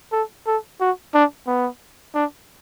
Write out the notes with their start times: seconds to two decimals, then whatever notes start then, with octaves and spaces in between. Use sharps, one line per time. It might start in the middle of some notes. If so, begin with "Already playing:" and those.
0.12 A4
0.47 A4
0.81 F#4
1.14 D4
1.47 B3
2.15 D4